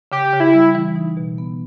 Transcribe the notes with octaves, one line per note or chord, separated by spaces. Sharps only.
C#3 G4
C#3
E4
G3
E3
D#4
B2
B3